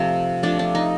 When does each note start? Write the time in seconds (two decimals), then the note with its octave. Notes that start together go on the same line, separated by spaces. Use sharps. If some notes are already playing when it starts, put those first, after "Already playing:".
Already playing: C3 F3 A3 D#4
0.43 C3 F3 A3 D4
0.59 D4
0.75 D#4